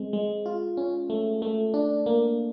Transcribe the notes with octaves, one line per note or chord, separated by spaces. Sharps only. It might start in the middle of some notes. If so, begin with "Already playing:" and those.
Already playing: G#3 C4
G#3
F4
C#4
A3
A3
D4
A#3